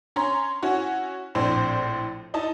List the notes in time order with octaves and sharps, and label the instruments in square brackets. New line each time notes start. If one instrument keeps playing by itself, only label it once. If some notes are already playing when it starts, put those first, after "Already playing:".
[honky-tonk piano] C#4 A#5 C6
C#4 E4 F#4
A#1 A2 C4 D4 C5 C6
D#4 E4 D#5 A5